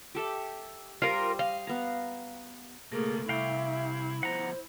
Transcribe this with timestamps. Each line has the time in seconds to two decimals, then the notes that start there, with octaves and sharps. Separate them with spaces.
0.15 G4 A4 E5
1.02 G3 F4 A#4 C5
1.39 D#5 F5
1.67 B3 A#5
2.92 C#2 B2 A3 A#3 G#4
3.29 C2 E4 E5 F5 G5
4.23 B2 F3 C5 F#5 A#5